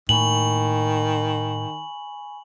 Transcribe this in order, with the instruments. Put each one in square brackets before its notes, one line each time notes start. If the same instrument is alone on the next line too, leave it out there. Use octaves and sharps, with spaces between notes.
[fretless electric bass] A2 A#3 [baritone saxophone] D#3 [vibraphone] G#5 B5 C#6 [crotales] F#7